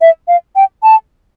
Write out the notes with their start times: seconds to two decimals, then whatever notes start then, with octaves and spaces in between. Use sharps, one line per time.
0.01 E5
0.28 F5
0.56 G5
0.83 A5